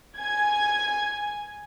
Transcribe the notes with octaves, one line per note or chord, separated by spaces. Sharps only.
G#5 G#6